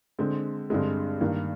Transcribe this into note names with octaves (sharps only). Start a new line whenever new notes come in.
D3 G#3 C4
G2 D3 G#3 C4
G2 D#3 A#3